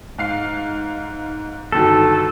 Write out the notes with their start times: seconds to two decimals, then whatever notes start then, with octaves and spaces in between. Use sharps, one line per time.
0.18 G#2 F5 C7
1.72 G1 D#3 F#3 A4